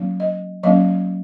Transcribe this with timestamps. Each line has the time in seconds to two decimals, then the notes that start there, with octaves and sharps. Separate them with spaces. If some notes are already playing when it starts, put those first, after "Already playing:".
Already playing: F#3 A#3 C#4
0.20 D#5
0.63 F#3 A#3 C#4 D#5